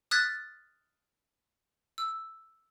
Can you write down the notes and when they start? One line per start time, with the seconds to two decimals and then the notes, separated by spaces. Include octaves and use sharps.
0.11 D#6 F6 F#6 G#6 A6 B6
1.98 E6